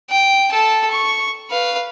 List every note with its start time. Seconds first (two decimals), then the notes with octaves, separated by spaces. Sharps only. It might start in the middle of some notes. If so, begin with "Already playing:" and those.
0.10 G5
0.51 A4 A5
0.91 C#6
1.50 B4 F5